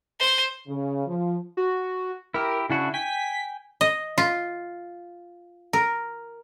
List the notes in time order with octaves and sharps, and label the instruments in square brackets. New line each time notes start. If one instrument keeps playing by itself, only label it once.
[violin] C5
[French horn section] C#3
F3
[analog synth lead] F#4
[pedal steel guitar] E4 G4 [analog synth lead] A#4
[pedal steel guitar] C#3 D4 F#4 [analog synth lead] E4
[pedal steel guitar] G5 G#5 [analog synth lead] B6
[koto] D#5
F4
A#4